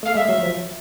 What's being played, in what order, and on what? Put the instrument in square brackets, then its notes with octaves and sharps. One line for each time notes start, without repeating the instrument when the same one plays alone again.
[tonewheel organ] A3 [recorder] F5
[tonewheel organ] G#3 [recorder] E5
[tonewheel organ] F#3
F3